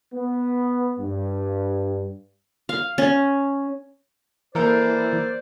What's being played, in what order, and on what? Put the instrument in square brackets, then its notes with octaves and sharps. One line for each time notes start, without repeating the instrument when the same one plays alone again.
[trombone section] B3
G2
[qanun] F5
C#4
[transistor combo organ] E3 [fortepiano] A#3 A4 A#4 [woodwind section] C5 D5